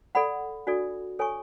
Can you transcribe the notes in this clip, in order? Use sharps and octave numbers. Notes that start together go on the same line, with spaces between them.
A4 D5 F#5 B5
D4 F#4 A4 D5
A4 C#5 G#5 C#6